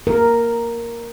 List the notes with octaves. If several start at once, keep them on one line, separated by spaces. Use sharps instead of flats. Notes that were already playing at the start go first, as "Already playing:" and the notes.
A#4